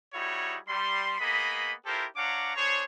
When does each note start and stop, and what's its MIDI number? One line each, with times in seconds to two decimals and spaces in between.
0.14 0.57 55
0.14 0.57 63
0.14 0.57 64
0.14 0.57 66
0.14 0.57 68
0.14 0.57 73
0.67 1.18 55
0.67 1.18 84
1.19 1.73 58
1.19 1.73 59
1.19 1.73 68
1.19 1.73 75
1.19 1.73 83
1.86 2.05 64
1.86 2.05 65
1.86 2.05 67
1.86 2.05 69
1.86 2.05 70
1.86 2.05 72
2.16 2.54 62
2.16 2.54 73
2.16 2.54 77
2.16 2.54 78
2.16 2.54 82
2.16 2.54 86
2.56 2.82 62
2.56 2.82 68
2.56 2.82 72
2.56 2.82 73